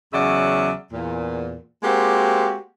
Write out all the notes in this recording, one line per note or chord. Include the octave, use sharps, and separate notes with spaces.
E2 C#3 F#3 D5 E5 F#5
E2 A#2
G#3 A#3 C4 F#4 G4